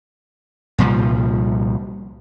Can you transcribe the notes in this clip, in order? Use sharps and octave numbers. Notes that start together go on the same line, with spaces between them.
C2 A#2 F3 G3